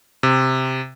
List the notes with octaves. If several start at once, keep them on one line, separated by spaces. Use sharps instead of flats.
C3